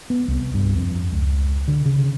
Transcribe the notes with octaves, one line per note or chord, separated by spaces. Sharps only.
B3
C2
G2
F2
C#2
D3
C#3